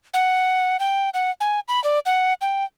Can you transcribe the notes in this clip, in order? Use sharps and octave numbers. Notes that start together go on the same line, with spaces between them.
F#5
G5
F#5
G#5
B5
D5
F#5
G5